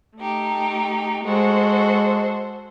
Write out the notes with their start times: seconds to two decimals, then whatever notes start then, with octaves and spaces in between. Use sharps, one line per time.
0.17 A3 D#4 G4
1.24 G#3 F#4 A4 C5